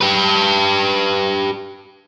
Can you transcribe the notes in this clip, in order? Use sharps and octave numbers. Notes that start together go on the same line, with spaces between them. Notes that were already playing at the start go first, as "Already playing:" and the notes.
G4 B4